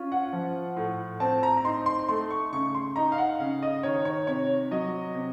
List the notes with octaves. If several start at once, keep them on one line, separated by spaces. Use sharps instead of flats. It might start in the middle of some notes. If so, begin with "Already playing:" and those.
Already playing: C#4 F4
F#5
F3
A2
C4 A5
A#5
A#5
D#4 C6
C6
A3 C6
C#6
C#3 C#6
C6
D#4 A#5
F5
F#5
C#3 F5
D#5
D#3 C#5
C#5
C3 C#5
F#3 D#5
C3